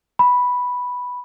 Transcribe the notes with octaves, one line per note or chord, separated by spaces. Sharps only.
B5